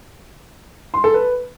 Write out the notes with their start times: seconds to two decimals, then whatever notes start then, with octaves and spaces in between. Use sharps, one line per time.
0.94 C6
1.04 A4
1.14 B4